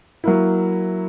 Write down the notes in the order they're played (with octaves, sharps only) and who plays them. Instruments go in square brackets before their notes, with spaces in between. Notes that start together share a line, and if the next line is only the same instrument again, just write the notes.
[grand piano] F#3 A#3 E4